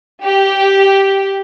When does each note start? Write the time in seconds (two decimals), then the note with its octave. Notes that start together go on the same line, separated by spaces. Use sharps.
0.24 G4